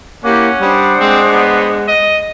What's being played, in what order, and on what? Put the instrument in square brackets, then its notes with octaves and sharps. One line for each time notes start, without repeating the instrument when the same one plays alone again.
[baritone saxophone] A#3 [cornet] C#4 [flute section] E4 G4 D6 [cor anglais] F#5
[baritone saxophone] G3 [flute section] D4 C5 D#6
[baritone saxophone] G#3 [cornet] C4
[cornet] B3
D#5